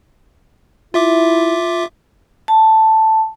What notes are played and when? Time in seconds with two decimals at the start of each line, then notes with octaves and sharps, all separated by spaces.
0.94 E4 F4 E5 D6
2.48 A5